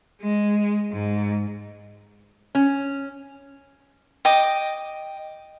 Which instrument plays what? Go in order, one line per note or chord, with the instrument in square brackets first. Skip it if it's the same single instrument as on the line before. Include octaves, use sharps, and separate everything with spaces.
[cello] G#3
G#2
[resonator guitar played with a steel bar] C#4
[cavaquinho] D#5 G5 D6